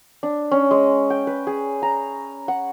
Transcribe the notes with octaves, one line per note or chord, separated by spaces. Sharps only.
D4
C#4
G#3
G5
B4
G#4
A#5
F#5